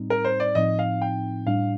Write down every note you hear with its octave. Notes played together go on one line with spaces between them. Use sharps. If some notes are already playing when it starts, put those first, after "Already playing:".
Already playing: A2 G3 C4 D#4
A#4
C5
D5
A2 F3 C4 D#4 D#5
F5
G5
A2 G3 D4 F5